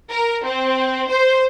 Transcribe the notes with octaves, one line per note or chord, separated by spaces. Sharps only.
A#4
C4
C5